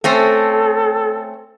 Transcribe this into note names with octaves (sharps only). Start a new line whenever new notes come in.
A3 C4 C#4 A4